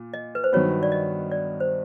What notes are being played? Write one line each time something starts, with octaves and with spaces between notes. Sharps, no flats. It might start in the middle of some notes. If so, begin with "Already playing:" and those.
Already playing: A#2
D#5
B4
C5
G2 D#3 F#3 B3 C#5
D5
D#5
D5
C5